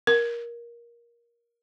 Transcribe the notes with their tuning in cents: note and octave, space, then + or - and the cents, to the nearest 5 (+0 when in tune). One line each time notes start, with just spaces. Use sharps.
A#4 +15